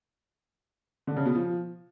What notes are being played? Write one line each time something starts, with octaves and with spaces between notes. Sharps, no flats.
D3
C#3
B2
F3